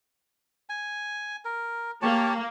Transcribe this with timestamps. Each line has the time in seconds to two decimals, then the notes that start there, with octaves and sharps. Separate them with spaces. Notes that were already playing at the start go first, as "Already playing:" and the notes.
0.69 G#5
1.45 A#4
2.02 A#3 G4 C#5 A5